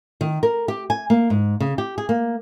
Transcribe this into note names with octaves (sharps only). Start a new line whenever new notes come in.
D#3
A#4
G4
G#5
A#3
G#2
C#3
G4
G#4
A#3